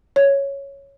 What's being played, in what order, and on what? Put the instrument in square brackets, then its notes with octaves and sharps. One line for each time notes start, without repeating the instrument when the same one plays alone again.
[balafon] C#5